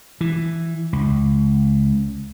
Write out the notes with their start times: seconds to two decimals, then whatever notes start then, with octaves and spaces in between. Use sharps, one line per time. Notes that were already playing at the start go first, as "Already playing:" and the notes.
0.21 E3
0.93 C#2